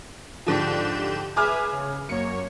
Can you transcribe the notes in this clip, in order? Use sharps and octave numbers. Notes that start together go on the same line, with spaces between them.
G#2 D3 F3 G4 G6 E7
G#4 B4 E5 G#5 D6 F6
C#3
F#2 A#3 C#5 C#7